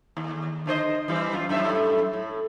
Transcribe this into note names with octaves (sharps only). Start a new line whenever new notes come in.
D#2
D3 C5 D#5
E3 G3 C4
F#2 F4
F#2 A2 E5
A2